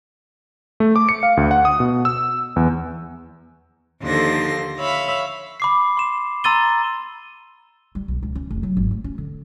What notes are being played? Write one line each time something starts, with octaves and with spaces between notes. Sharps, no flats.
A3
D6
C#7
F5
D2
F#5
D#6
B2
E6
E2
D#2 D3 F3 A4 C6 A#6
C#5 E5 F5 B5
B5 D6 C7
C6 E7
A#5 C6 E6 A6 D#7 G7
G3
B1
C#2
C#4
F1
F#3
G#1
A3
C#4
D3